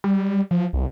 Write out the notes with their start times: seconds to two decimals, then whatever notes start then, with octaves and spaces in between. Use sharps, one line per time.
0.04 G3
0.51 F3
0.73 C2